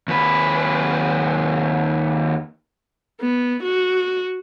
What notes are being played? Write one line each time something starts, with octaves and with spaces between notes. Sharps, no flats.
D#2 B4
B3
F#4